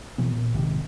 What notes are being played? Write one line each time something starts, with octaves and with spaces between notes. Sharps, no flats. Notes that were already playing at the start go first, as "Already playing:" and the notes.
B2 E3 B3
A#2
A#1 G#2 C3 D#3